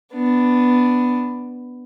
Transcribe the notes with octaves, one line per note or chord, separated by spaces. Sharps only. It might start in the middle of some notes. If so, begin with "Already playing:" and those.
B3 D4